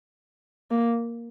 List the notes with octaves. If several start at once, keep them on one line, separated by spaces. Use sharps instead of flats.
A#3